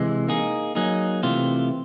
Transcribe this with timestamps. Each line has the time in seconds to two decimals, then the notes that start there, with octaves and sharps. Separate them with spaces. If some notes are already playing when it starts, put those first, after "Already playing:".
Already playing: C3 E3 G#3
0.29 A#3 D#4 G#4
0.75 F#3 A#3 D#4 G#4
1.23 C3 E3 A3 C4 F4